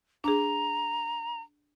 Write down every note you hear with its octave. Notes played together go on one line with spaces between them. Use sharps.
D4 G#4 A#5